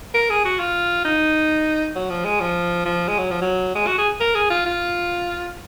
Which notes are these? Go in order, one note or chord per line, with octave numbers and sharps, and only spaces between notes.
A#4
G#4
F#4
F4
D#4
F#3
F3
G#3
F3
F3
G#3
F#3
F3
F#3
G#3
F#4
G#4
A#4
G#4
F4
F4